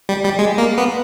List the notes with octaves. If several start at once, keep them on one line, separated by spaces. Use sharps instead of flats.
G3
G3
G#3
A#3
B3